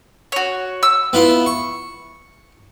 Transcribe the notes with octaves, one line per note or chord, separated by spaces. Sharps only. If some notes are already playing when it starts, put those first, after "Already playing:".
F#4 C#5
E6
B3 E4 F4
C#6